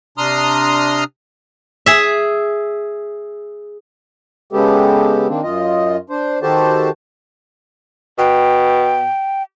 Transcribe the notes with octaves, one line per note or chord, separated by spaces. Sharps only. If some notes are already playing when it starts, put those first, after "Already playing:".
C3 D4 A#5 C6 D#6 F6
G#4 E5
C#3 G#3 B3 G4 A4
D#3 A#3 C4 D4
F#2 F4 D#5
D4 C5
D#3 F#4 G4 A4 C5 A5
B2 G5